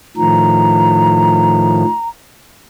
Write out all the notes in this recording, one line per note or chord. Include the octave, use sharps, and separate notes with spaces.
A2 D#3 F3 A#5